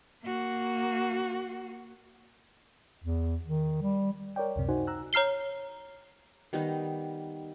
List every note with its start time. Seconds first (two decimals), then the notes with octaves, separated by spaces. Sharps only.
0.23 A#3 F#4
3.04 E2
3.44 D#3
3.82 G3
4.36 A#4 C#5 D5 G5
4.56 C#2 F#2 C3
4.69 D#4 F#4 C5 F#5 G#5
4.87 A#5 E6 F#6
5.13 C#5 A#5 F6 C7 G7
6.53 D#3 G3 B3 D#4